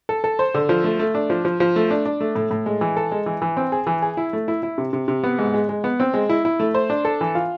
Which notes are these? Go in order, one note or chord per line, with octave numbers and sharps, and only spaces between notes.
A4
A4
C5
D3
F3
A3
A3
D4
F3
F3
F3
A3
D4
D4
A3
A2
A2
G#3
E3
A4
G#3
E3
E3
C4
G#4
E3
G#4
E4
A3
E4
E4
C3
C3
C3
B3
G#2
G#3
G#3
B3
C4
G#3
E4
E4
A3
C5
D4
A4
E3
F4